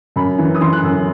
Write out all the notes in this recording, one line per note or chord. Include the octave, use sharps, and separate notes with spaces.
F#2 B5
E3
D#6
E3 C6
F#6
F#2 E6